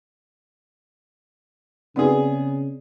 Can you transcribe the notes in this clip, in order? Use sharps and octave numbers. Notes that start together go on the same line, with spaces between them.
C#3 B3 C4 G#4 D5